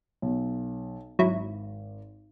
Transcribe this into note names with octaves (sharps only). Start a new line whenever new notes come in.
B1
G#1 F#3 E4